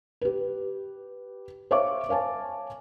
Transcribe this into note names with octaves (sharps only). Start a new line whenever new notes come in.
G4 B4
C5 C#5 E5 F5 C#6 D6
C#5 F5 G#5 A5